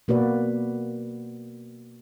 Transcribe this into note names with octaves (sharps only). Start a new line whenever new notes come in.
B2 A#3 F#4 B4 D5